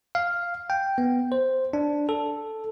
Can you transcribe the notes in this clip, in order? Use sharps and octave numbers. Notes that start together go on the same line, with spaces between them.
F5
G5
B3
C5
D4
A4